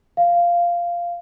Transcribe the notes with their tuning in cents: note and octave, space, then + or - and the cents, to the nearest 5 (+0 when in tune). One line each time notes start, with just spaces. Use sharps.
F5 -10